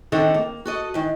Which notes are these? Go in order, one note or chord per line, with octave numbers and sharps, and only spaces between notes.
D3 D#3 C4 D#4 A4 F#5
A#3
F#4 A4 D#5
D#3 E3